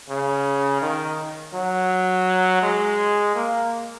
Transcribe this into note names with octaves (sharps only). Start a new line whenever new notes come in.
C#3
D#3
F#3
G#3
A#3